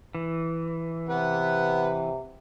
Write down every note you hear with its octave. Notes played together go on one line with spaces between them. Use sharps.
E3
C3 B4 F#5